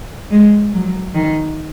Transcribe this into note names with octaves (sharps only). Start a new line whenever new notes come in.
G#3
F#3
D#3